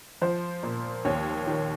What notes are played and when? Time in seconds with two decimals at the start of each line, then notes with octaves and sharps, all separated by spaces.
0.22 F3 C5
0.63 A#2
1.05 D#2 C#5
1.47 D#3